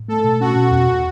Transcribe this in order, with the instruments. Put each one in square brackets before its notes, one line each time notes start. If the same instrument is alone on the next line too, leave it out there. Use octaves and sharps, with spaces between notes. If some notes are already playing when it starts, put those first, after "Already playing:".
Already playing: [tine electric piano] A2
[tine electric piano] A3 [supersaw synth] A4
[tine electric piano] B2
[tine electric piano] C#4 [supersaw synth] F#4
[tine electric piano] B2
E2